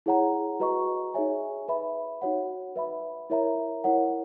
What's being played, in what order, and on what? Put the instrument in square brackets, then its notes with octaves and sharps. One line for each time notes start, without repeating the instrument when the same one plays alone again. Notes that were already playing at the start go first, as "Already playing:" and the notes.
[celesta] E4 G#4 C#5 F#5 A#5
F#4 B4 D#5 A#5 C#6
D#4 G#4 C#5 E5 G#5
B4 E5 B5
D#4 F#4 C#5 F#5
B4 E5 B5
E4 A#4 C#5 E5 A#5
E4 A#4 C#5 F#5